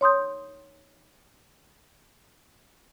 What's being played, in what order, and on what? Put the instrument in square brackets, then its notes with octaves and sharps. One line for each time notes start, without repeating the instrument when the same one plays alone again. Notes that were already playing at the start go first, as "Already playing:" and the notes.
[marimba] C#5 C6 D#6 G6